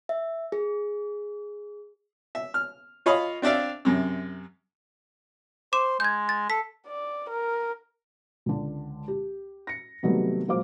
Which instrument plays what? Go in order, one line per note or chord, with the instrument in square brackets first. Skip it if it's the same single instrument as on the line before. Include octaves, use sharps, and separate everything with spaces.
[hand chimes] E5
G#4
[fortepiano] E5
F6
F4 C#5 D#5 F5 B5 D#6
C4 D4 D5 E5 F5
F#2 C3
[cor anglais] C5 [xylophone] D6 E7
[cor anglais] G#3 [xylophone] G6 G#6
[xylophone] A6
[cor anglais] A4 [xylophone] B6
[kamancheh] D5
A#4
[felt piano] C#2 D3
G4
A#6 C#7
C3 D#3 F#3 G3 A3 B3
A#2 F#3 G#3 C5 F5 D6